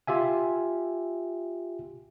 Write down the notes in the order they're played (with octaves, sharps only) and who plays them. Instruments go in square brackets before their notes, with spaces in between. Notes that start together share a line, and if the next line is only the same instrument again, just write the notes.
[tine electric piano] F4 G4 E5 G#5